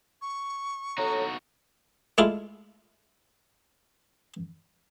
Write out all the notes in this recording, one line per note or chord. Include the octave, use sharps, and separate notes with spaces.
C#6
D#4 F#4 A4 C#5 A#5
G#3 A3 E4 F4 D6